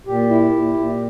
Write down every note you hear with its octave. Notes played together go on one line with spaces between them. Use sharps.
A#2 G4
E4
A#2
A#2